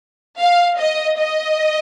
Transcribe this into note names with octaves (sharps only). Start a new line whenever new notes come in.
F5
D#5
D#5